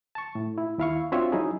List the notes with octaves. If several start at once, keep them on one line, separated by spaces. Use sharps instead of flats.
A5 C#6
A2
E4
D#2 E4 F5 C#6
C4 D4 F4 F#4 C#5 E5
F#3 C#4 D#4 E4 G#4